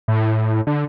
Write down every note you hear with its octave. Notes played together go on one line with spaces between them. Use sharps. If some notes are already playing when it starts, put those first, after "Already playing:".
A2
D3